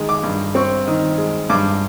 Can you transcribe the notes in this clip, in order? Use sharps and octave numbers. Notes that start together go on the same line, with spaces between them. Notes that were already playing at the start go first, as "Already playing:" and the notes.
Already playing: D#3 G#3
D6
G2
C4 C#6
D#3
G#3
G2 D6